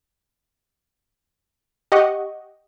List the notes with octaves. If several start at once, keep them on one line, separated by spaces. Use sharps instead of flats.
G4 D#5 F#5 C#6